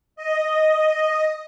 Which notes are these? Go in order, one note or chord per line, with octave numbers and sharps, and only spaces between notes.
D#5